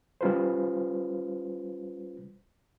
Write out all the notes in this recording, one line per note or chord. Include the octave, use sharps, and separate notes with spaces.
G3 C#4 F4 B4 C5